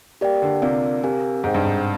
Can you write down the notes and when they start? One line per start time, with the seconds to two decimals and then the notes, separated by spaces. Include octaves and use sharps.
0.21 A#3 G4 D5 G5
0.42 D3
0.62 C3 F4 A#4 D5 F5
1.03 C4 G4 A#4 F5 G#5
1.44 G#2 G#4 C5 G5
1.54 G2
1.65 G#2